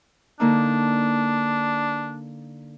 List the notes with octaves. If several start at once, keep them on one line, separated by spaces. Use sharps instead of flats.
D3 A#3 D4 D#4